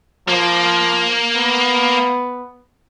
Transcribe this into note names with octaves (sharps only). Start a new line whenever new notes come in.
F3 A#3
B3